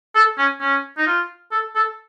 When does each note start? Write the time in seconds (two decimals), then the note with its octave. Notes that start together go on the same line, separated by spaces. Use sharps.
0.15 A4
0.38 C#4
0.61 C#4
0.98 D#4
1.07 F4
1.52 A4
1.75 A4